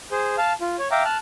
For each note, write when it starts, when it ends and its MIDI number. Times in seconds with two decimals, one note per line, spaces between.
0.11 0.36 68
0.11 0.36 72
0.38 0.53 77
0.38 0.53 81
0.61 0.76 65
0.79 0.88 73
0.91 1.03 76
0.91 1.03 77
0.91 1.03 79
0.91 1.03 82
0.91 1.03 86
1.05 1.17 81
1.05 1.17 89
1.05 1.17 90